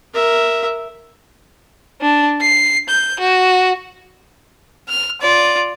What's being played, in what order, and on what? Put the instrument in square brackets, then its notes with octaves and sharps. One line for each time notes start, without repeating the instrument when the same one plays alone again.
[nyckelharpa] A#4 E5
[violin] D4
C7
G6
F#4
[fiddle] F6
F4 D5